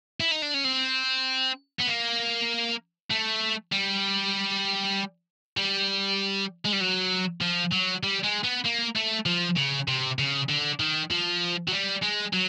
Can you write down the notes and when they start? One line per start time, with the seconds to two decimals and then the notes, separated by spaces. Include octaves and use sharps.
0.20 E4
0.31 D#4
0.42 D4
0.54 C#4
0.64 C4
1.79 B3
1.87 A#3
3.11 A3
3.72 G3
5.57 G3
6.65 G#3
6.72 G3
6.80 F#3
7.42 F3
7.73 F#3
8.03 G3
8.24 G#3
8.44 B3
8.65 A#3
8.95 A3
9.26 F3
9.57 C#3
9.88 C3
10.19 C#3
10.49 D3
10.80 D#3
11.11 F3
11.68 F#3
11.73 G3
12.03 G#3
12.33 F#3